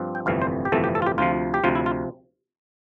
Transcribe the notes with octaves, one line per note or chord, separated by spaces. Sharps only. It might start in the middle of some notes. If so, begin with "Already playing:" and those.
Already playing: G2 F3 C4
G5
G1 F2 C3 E3 A3 F5
C5
G4
G1 F2 C3 E3 A3 A4
G4
A4
F4
G4
D2 C3 F3 F4
G4
D2 C3 F3 F4
E4
F4